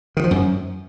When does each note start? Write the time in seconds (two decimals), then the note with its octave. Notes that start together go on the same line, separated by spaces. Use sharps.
0.17 D#3
0.24 F3
0.31 F#2